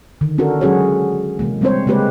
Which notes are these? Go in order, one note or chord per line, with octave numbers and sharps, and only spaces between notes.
D3 D#3
C#4 D4 F#4 A4 A#4
F#3 G#3 C#4 F#4 G#4 C#5
C3 E3 G#3 A#3
G3 G#3 C4 D4 C5 C#5
C#3 G#3 A#3 G4 B4 C#5